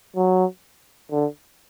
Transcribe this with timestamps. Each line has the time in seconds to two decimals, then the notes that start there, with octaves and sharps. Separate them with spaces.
0.16 F#3
1.12 D3